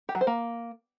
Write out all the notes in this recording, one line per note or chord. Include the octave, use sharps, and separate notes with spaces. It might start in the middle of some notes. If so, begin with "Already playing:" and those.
G4
F#3
C5
A#3